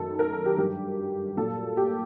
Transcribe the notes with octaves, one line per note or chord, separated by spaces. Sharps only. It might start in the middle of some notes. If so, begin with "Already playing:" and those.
Already playing: F#2 D#3 F#3 A4
A#4
A4
G4
G2 F#3 G4
A#2 F#3 A4
G4